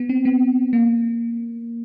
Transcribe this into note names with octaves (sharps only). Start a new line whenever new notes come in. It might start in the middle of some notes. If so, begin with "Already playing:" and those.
Already playing: B3
C4
B3
A#3